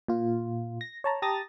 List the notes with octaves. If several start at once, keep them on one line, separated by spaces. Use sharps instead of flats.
A#2 F4
A#6
C#5 A5 A#5
G4 A5 A#5 D#6 A6 A#6